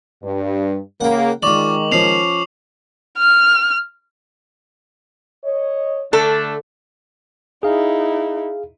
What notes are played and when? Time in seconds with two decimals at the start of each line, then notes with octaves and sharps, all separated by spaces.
0.23 G2
1.01 C#3 A#3 F#5 G5
1.42 D#3 G#3 F4 D5 C#6 D6 F#7
1.92 F3 C#4 C7 F7
3.18 F6
5.44 C#5 D#5
6.13 D3 A3 D4 A4
7.63 D#4 E4 G#4 F5